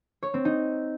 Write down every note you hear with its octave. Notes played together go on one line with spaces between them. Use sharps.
C#5
C4
D#4